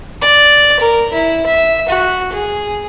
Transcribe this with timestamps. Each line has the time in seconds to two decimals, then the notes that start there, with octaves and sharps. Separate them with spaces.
0.21 D5
0.80 A#4
1.13 E4
1.47 E5
1.89 F#4
2.32 G#4